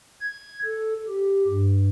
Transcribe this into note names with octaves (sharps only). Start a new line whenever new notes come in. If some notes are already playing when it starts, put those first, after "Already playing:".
G#6
A4
G4
G2